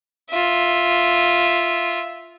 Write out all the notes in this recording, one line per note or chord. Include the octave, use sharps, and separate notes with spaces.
F4 E5